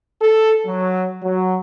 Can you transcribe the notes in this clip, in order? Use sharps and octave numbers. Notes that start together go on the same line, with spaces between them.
A4
F#3
F#3